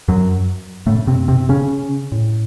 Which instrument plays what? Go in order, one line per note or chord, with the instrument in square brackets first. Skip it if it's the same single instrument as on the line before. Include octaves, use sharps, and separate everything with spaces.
[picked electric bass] F#2 F#3
F#2 A2 C#3 A3
C3 C4
C3 C4
C#3 C#4
A2